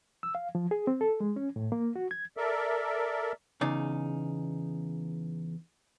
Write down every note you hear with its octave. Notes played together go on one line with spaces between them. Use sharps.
E6
F5
F3
G#4
C4
A4
G#3
C#4
A2
A#3
F#4
G#6
A4 A#4 D5 E5
E2 C#3 D#4 D5